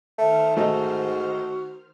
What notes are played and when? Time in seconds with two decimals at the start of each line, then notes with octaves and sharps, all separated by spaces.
0.18 D#3 A3 C5 F6
0.57 G#2 A3 D#4 F#4